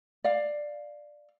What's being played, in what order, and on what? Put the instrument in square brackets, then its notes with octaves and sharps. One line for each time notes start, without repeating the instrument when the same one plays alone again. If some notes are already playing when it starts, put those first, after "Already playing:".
[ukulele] D5 F5